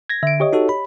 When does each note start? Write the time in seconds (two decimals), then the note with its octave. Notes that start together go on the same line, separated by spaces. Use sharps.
0.09 G#6 A#6
0.23 D3 E5 D7
0.40 G4 C#5 D#5
0.53 D#4 F#4 A4
0.69 B5